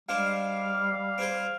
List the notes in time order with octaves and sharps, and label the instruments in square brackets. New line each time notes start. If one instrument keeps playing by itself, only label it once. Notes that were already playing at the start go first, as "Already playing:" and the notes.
[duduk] G3 [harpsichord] G#3 D4 C5 [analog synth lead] F5
[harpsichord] C4 G#4 C5